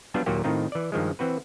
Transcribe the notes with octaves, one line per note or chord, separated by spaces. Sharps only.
F#3 G3 B3 D4 F4
D#2 A#2 F#3 A#3 F#4 G4
A2 D#3 C4 D#4 F4
E3 D5
G2 D#3 F3 G#3
E3 C4 F#4 B4